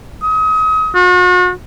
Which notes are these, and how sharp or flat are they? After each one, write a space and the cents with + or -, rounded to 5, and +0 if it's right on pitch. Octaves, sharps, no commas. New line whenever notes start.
D#6 +35
F#4 -40